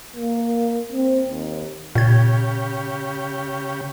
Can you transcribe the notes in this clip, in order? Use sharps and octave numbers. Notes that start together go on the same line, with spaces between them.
A#3
C4
D#2
A#2 C#3 G4 G#6